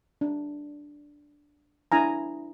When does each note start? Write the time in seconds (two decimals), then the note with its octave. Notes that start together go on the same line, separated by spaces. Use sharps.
0.21 D4
1.92 D4 E4 G#5 A#5